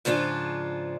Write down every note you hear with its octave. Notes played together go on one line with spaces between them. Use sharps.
G#2 C#3 F3 D4 F4